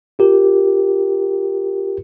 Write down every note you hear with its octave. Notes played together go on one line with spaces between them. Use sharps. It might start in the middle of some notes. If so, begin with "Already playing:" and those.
F4 G4 A#4